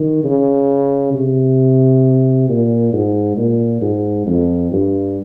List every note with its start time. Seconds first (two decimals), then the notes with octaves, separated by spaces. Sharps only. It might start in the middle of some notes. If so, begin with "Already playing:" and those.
Already playing: D#3
0.24 C#3
1.14 C3
2.49 A#2
2.93 G#2
3.37 A#2
3.82 G#2
4.27 F2
4.72 G2